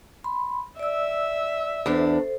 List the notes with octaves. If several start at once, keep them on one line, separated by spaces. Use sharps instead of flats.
B5 C6
D5 E5 E6
E2 D4 A4 C5